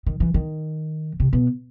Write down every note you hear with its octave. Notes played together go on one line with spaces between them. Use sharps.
D#3
E3
D#3
C3
B2